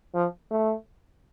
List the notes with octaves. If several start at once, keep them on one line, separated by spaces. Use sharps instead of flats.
F3
A3